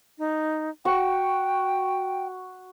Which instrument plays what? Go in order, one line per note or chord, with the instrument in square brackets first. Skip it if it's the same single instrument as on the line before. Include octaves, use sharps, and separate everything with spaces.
[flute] D#4
[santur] F#4 C#6 [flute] G5